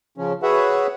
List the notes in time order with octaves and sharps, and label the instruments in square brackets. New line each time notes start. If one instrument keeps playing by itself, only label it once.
[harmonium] C#3 F3 C#4
F#4 G#4 B4 C#5 E5 F#5